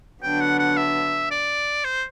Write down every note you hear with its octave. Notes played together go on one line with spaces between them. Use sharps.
D3 F#3 B3 D4 G5
F#5
F#5
E5
D5
C5